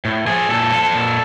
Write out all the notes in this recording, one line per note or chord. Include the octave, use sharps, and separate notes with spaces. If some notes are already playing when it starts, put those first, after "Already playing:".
A2
F3 G#4
A#2 A4
F3
A#2